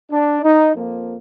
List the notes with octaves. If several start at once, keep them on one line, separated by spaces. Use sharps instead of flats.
D4
D#4
F2 F3 A#3